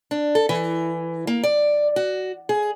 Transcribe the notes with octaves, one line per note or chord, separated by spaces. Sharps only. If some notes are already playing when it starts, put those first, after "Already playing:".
D4
A4
E3
A#3
D5
F#4
G#4